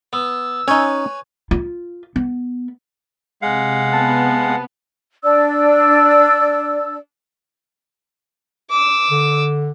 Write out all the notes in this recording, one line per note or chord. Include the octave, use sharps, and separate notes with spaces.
B3 E6
C#4 D#4 B4 C#5 G#5
F4
B3
C3 G#3 F5 F#5
B3 A5
D4 D5 E6
D6 E6
D3